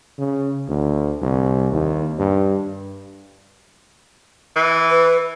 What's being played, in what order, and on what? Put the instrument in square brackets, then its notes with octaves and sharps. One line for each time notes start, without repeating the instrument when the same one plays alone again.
[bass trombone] C#3
D2
C2
D#2
G2
[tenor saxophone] E3
[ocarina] B4